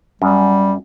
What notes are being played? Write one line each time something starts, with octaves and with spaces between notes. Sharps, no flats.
F#2 G3